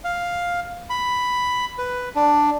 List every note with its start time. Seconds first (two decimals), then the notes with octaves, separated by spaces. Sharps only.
0.04 F5
0.90 B5
1.78 B4
2.15 D4